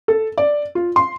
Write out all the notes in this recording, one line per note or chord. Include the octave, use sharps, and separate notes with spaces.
A4
D5
F4
C6